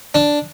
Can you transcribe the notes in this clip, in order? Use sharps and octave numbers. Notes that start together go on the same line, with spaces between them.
D4